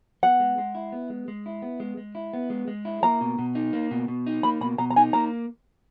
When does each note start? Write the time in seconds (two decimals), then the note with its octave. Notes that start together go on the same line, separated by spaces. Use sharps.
0.23 B3 F#5
0.40 G#3
0.58 G#3
0.75 E4
0.92 B3
1.10 G#3
1.28 G#3
1.46 E4
1.62 B3
1.80 G#3
1.97 G#3
2.15 E4
2.33 B3
2.50 G#3
2.68 G#3
2.85 E4
3.03 A#3 A#5
3.21 B2
3.39 B2
3.55 D#4
3.73 A#3
3.91 B2
4.08 B2
4.27 D#4
4.43 A#3 B5
4.61 B2 B5
4.78 B2 A#5
4.90 A#5
4.96 D#4 G#5
5.13 A#3 A#5